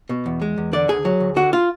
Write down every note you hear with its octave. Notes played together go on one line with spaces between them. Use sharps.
B2
E2
G#3
E2
D3 D5
D2 G#4
F#3
D2
D3 F#4
F4